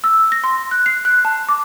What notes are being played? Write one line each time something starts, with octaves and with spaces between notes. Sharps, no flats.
E6
A#6
C6
F#6
C7
F#6
A5
D6